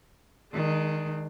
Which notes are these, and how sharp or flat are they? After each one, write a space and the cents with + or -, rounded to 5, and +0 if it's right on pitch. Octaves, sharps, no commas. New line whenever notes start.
D#3 +5 G#3 +0 D4 +35